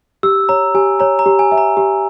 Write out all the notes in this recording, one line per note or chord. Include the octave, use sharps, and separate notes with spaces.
G4 E6
C#5 A#5
G4 G#5
C#5 A#5
A#5
G4
G#5
E5
A#5
G4